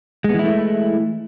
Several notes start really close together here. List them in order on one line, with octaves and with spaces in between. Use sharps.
G#3 B3 E3 E4 A3